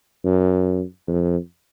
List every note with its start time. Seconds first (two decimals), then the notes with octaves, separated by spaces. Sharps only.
0.24 F#2
1.08 F2